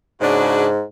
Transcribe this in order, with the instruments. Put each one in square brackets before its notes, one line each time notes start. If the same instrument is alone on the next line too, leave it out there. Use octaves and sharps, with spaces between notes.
[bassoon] G#2 [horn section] C#3 D4 F#4